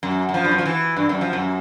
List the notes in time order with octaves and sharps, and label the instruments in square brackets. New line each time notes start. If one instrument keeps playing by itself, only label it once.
[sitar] F#2
F#2
F3
G2
F#2
F3
E3
G2
F#2
F3
F#2